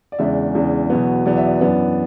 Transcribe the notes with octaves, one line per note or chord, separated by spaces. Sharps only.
D5
E2 C#3 G#3 D4 E5
E2 C#3 G#3 D4
E2 B2 F#3 B3
E2 B2 F#3 B3 D5
E5
D5
F#2 E3 B3 D4